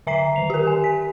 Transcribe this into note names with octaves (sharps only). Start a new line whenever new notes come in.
D3 E5 A#5 B6 C7
D#3 F7
G4 A#4
G#5
B6